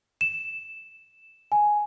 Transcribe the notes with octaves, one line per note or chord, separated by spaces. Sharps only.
E7
G#5